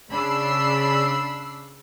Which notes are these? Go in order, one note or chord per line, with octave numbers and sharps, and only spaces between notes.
C#3 D4 B5 E6 C7